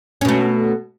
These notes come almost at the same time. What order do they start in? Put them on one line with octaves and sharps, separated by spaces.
C#4 B2 A3